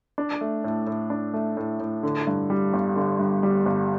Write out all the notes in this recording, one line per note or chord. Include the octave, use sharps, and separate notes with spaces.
D4
A3
A2
A2
D4
A3
A2
A2
D3
G2
G3
G1
D3
G2
G3
G1